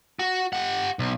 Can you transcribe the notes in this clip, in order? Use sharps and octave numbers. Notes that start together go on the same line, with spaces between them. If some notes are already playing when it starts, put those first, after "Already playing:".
F#4
G4 F#5
B1